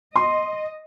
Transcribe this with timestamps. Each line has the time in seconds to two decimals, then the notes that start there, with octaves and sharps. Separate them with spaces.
0.16 D#5 C6